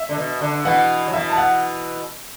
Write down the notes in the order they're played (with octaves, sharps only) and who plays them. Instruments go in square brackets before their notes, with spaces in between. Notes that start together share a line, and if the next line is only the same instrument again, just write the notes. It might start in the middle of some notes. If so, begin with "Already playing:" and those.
Already playing: [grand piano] E5
[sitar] D3
B2
D3
[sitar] B2 E3 [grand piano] F#5
[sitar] F#3
[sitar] B2 E3 [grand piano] E5
[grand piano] A5
F#5